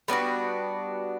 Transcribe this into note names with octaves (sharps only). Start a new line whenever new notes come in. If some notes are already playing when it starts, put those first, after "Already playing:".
G3 B3 D4 F#4